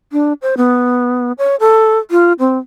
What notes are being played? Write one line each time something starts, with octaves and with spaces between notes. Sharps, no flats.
D4
C5
B3
C#5
A4
F4
C4